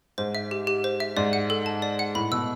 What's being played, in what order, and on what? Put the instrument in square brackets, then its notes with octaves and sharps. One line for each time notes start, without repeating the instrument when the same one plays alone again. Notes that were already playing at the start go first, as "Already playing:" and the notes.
[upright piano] G#2 [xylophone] C5
[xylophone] E5
G4
G4
C5
E5
[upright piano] G#2 [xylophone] D5
[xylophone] F#5
A4
A5
D5
F#5
[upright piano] A2 [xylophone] B5
[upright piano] B2 [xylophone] E6